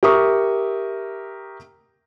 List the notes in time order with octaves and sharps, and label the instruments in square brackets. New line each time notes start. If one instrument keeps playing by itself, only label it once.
[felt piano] G4 A#4 E5 C#6 D#6